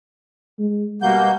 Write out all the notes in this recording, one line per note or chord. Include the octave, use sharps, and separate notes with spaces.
G#3
B2 G3 A#3 F#5 G6